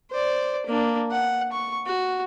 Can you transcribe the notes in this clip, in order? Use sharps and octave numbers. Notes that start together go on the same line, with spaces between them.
C5 D5
A#3 D4
F#5
C#6
F#4